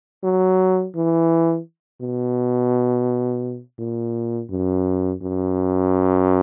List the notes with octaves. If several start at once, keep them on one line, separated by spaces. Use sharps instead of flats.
F#3
E3
B2
A#2
F#2
F#2